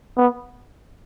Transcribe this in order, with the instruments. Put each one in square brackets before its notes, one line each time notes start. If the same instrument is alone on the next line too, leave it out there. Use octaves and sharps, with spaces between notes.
[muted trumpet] B3